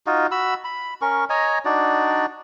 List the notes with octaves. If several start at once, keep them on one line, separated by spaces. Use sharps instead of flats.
D#4 F4 F#4
F#4 B5 E6
B5
C#4 A#4 C#6
C#5 D#5 G#5 A#5
D4 D#4 F#4 D5